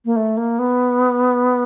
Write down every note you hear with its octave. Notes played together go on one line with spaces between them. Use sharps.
A#3
A3
A#3
B3